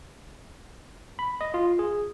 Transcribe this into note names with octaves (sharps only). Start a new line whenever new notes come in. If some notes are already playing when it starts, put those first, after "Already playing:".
B5
D#5
F4
G#4